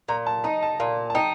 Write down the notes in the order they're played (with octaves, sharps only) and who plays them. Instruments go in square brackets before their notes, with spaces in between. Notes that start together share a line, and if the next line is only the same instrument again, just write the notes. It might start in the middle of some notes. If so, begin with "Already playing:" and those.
[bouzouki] A#2 [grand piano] A#5
[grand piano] A5
[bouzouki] D#4 [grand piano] A#5
[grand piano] A5
[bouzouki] A#2 [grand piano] F5
[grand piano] A5
[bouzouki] D#4 [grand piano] G5